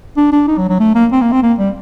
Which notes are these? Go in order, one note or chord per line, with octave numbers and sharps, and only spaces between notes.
D4
D4
D#4
F#3
F#3
A3
A#3
C4
A#3
C4
A#3
G3